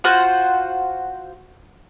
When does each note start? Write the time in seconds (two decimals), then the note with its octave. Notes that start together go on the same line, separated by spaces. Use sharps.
0.04 F4 F#4 C5 F#5